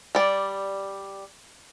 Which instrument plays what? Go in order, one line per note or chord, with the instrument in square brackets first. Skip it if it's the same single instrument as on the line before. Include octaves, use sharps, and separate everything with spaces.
[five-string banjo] G3 D5